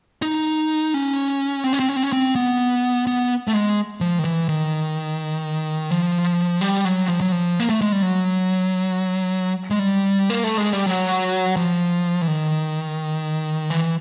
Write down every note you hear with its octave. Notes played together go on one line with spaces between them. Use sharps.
D#4
C#4
C4
C#4
C4
C#4
C4
C#4
C4
B3
B3
A3
G#3
F3
D#3
E3
D#3
F3
G3
F#3
F3
F#3
F3
A#3
A3
G#3
G3
F#3
G#3
G3
A#3
A3
G#3
G3
F#3
F3
E3
D#3
E3